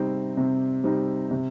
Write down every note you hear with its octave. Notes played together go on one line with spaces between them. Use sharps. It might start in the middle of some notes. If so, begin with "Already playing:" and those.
Already playing: C3 G3 C4 D#4
C3
G3 C4 D#4
C3